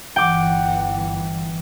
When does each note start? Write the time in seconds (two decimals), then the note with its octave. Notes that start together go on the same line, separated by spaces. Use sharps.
0.16 G1 E3 F#5 G5 D6